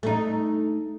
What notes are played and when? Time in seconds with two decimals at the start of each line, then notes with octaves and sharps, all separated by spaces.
0.03 A3 D#4